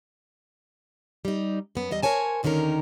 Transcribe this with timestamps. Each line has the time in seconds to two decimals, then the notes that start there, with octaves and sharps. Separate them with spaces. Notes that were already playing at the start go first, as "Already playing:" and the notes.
1.25 G3 D#4
1.75 F#2 B3
1.91 E2 G3 D#5
2.03 A#4 C5 C#5 G#5 A5
2.43 D#2 D3 D#3 C#4 D#4 A#4